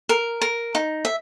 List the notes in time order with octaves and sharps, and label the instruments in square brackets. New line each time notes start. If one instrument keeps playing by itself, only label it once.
[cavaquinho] A#4
A#4
D#4
E5